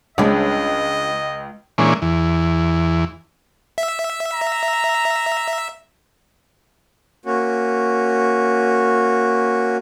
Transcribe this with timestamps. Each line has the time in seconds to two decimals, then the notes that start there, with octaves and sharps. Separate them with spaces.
0.18 C#2 G#3 C#4 D4 D#5
1.78 A#2 E3 G#3 C#4 D4
2.02 E2
3.78 E5
4.34 A#5
7.25 A#3 C#4 F#4